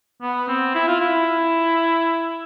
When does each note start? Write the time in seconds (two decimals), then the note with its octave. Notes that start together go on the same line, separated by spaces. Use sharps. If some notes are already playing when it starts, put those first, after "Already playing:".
0.22 B3
0.48 C4
0.75 E4
0.88 F4
1.00 E4